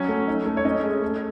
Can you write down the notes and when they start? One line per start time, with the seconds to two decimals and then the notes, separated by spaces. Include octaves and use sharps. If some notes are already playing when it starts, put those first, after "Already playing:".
Already playing: F#3 C#4 C#5
0.09 A3
0.27 D#4
0.46 A3
0.57 C#5
0.65 C#4 D#5
0.83 G#3
1.02 A3